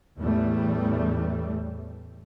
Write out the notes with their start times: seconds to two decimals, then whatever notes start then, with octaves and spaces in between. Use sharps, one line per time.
0.19 A1 E2 E3 G3 A3